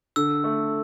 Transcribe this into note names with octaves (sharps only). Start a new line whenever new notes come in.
D3 E6
A3